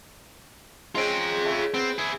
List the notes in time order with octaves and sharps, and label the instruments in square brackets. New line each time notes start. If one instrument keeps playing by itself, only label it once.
[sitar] G#3 C4 C#4 [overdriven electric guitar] F4 G5
[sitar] C#3 A3
[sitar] B3 [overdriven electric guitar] C4
[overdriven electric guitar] E4 G#4